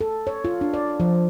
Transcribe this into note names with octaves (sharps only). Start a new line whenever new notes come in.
A4
C#5
F4
D4
D5
F3